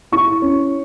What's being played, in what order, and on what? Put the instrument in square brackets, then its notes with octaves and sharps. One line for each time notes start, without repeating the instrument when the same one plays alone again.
[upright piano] E4 C#6
C#4